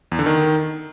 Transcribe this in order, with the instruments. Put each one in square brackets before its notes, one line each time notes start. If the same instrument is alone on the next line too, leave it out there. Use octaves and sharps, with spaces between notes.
[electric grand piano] E2
D3
D#3